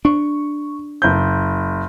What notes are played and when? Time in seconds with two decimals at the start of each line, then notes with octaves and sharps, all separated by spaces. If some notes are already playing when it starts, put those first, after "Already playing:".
0.05 D4 C#6
1.02 F#1 G6